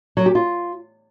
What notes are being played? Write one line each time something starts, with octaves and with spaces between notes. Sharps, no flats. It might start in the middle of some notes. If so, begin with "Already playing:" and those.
F#3
G4
F4